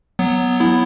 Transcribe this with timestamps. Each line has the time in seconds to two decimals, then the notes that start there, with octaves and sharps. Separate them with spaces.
0.19 F#3 B3
0.60 B3 E4